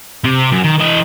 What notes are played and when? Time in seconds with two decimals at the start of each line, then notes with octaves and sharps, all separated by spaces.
0.24 C3
0.52 F#2
0.64 D#3
0.79 E3 D#5